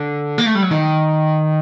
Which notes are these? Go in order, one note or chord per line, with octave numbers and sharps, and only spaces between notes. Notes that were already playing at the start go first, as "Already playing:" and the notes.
Already playing: D3
A#3
A3
G3
F#3
D#3